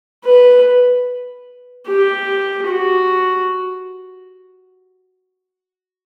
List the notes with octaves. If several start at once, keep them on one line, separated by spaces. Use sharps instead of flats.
B4
G4
F#4